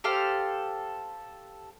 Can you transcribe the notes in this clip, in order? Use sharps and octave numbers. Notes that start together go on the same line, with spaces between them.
G4 A4 C5 F5